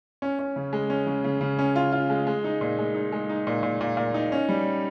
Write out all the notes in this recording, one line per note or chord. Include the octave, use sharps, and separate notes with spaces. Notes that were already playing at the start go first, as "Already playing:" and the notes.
C#4
C#4
C#3
G#3
C#4
C#3
C#3
C#3
C#4
F4
F4
G#3
G#3
D#4
A#2
G#3
D#4
G#3
D#4
A#2
A#2
A#2
A#2
D#4
C#4
G3